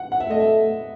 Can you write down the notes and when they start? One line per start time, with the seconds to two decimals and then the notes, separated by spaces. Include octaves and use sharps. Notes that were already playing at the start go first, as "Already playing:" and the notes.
Already playing: F#5
0.12 F#5
0.20 E5
0.29 A3 D#5
0.40 E5